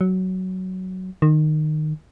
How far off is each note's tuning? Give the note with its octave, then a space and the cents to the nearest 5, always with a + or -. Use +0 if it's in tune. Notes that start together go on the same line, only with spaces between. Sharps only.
F#3 +10
D#3 -20